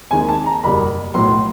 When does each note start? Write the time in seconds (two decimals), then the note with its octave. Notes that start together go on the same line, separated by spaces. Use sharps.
0.11 D#2 D#3 G#3 C4 G#5
0.29 A5
0.46 A#5
0.63 F#1 E2 B2 G3 B5
1.14 B1 A2 F#3 B3 C6